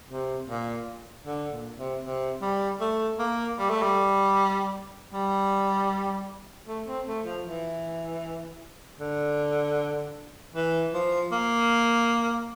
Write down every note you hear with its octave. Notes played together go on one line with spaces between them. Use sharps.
C3
A#2
D3
A#2
C3
C3
G3
A3
A#3
G3
A3
G3
G3
A3
C4
A3
F3
E3
D3
E3
F3
A#3